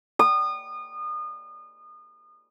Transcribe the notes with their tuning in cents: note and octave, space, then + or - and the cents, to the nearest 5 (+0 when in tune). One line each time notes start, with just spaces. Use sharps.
D#6 -30